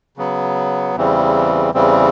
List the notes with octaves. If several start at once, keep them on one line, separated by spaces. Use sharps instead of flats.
C#3 F#3 B3
E2 C#3 E3 G3 C4
E2 C#3 E3 G3 C4